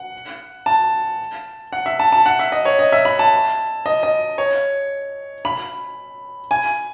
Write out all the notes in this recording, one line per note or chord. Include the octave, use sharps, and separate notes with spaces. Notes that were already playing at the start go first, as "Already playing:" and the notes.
Already playing: F#5
A5
F#5
E5
A5
A5
F#5
E5
D#5
C#5
D#5
E5
B5
A5
D#5
D#5
C#5
B5
G#5